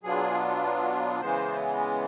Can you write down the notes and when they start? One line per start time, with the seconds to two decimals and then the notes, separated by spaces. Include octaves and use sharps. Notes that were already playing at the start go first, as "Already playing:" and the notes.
0.03 B2 F#3 B3 D4 F4 G#4
1.21 C#3 E3 G#3 B3 C5